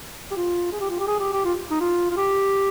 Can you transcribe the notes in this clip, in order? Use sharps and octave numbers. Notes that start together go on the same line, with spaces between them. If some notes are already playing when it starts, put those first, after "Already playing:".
G4
F4
G#4
G4
F4
G4
G#4
G4
G4
F4
D#4
F4
F4
G4